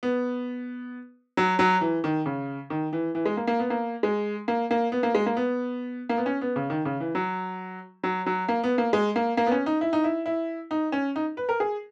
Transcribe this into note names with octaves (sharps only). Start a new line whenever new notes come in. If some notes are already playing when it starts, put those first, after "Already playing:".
B3
F#3
F#3
E3
D#3
C#3
D#3
E3
E3
G#3
A#3
A#3
B3
A#3
G#3
A#3
A#3
B3
A#3
G#3
A#3
B3
A#3
B3
C#4
B3
C#3
D#3
C#3
E3
F#3
F#3
F#3
A#3
B3
A#3
G#3
A#3
A#3
B3
C#4
D#4
E4
D#4
E4
E4
D#4
C#4
D#4
B4
A#4
G#4